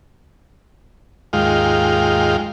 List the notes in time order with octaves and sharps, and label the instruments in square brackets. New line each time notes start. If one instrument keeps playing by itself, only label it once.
[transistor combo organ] D#2 G#2 G#3 F4 F5 G5